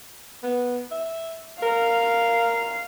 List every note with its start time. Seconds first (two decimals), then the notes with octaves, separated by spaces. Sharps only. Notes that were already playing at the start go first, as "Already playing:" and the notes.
0.43 B3
0.91 E5
1.63 A#4 F5